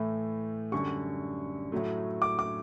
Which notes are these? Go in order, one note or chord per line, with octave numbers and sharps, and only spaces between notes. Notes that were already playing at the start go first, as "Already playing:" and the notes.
Already playing: A2 E3 A3
F#2 D3 G3 C#6
A2 F#3 A3
D6
D6